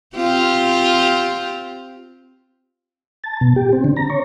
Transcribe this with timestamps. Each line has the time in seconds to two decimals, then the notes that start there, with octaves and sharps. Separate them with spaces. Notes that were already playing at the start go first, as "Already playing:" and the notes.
0.16 C4 F4 G4
3.24 A5
3.41 B2
3.56 G4
3.73 C4
3.84 D3
3.97 A#5
4.10 C#5